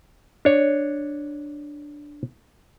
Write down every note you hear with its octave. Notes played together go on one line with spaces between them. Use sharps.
D4 C#5